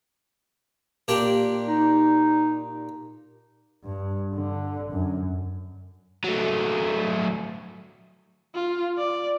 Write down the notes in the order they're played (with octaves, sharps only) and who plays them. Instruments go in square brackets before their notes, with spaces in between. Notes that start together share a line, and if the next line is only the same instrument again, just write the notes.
[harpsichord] A#2 D4 G4
[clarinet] D#4
[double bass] G2
D3
F#2
[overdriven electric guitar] F#3 A3
[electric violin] F4
D5